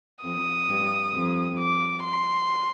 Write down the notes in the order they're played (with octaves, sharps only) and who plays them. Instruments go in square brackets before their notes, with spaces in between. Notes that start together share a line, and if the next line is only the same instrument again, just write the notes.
[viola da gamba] F2 [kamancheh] D#6
[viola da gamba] G2
F2
[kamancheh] D6
C6